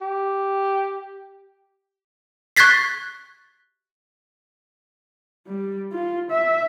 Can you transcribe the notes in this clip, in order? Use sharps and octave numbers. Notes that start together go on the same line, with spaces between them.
G4
C#6 F#6 G#6 A6 B6 C7
G3
F4
E5